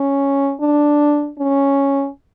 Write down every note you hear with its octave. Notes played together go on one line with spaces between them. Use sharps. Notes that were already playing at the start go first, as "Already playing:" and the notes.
Already playing: C#4
D4
C#4